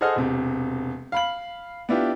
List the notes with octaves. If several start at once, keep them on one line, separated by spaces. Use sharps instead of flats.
G#4 A4 C5 D#5 F#5 F6
E1 C3
F5 B5 F#7
B3 D4 E4 F4 G4